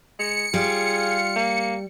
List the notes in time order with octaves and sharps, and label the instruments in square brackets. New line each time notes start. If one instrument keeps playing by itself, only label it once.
[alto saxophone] G#3 [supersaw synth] C#7
[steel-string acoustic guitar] G3 [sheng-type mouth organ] F4 F5 [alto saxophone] G#4
[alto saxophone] A#3